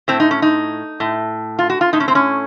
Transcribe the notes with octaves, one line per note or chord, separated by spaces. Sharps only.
A2 C4
D#4
C#4
D#4
A2
F4
F#4
F4
A2 D#4
C#4
C4
C#4